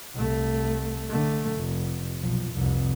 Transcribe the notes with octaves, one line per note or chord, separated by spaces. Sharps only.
C2 A3
D3 A3
F1
B1 F3
F1 C2